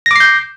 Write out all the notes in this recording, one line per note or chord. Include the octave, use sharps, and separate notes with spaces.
D6 G6 A#6 C7